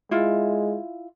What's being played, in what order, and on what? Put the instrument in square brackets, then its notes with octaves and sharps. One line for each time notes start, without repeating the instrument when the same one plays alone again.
[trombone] G#3 [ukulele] E4 F4